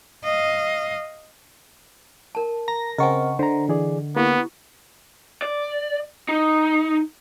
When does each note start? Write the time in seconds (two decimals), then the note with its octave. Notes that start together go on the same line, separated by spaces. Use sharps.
0.24 D#5 F5
2.35 A#4 A5
2.68 A#5 A#6
2.98 C#3 C4 A#4 D#5 F#5 G#5 C#6
3.39 D3 C5 A#5
3.69 E3 G#4 D5
4.16 A#3 B3 E4 G4
5.42 D5
6.29 D#4